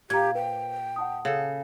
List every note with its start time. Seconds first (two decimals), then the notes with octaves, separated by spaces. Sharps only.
0.10 A#2 G4 A#5 G#6
0.35 B4 C5 G5
0.96 F#5 A5 D#6
1.25 C#3 A4